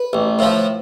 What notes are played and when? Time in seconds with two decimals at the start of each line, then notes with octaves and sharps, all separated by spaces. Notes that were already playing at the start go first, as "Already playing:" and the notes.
Already playing: B4
0.13 A1
0.39 A2 F3